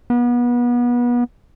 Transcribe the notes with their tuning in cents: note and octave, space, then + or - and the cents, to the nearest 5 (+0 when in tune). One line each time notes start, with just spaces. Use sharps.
B3 -30